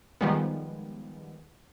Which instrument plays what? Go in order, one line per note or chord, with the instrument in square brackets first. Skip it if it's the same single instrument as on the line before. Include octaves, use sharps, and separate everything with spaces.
[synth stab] D#3 F3 G3 G#3 B3